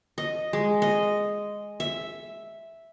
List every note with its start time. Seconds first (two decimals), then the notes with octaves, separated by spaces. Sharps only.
0.18 D#5
0.53 G#3
0.82 D#5
1.80 E5